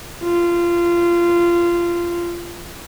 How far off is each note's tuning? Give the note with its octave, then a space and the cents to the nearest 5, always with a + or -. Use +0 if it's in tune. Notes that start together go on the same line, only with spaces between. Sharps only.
F4 -20